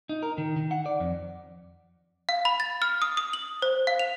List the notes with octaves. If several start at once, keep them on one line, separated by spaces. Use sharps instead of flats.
D#4
A#4
D#3
D#3
F#5
D5
F2
F5
B5
A6
F6
D#6
D#6
F#7
C5
F5
F7